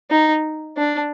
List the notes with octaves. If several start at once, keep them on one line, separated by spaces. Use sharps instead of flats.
D#4
D4